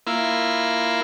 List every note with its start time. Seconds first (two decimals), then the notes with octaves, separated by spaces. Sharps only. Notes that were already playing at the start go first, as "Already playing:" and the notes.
0.07 A#3 E4 F4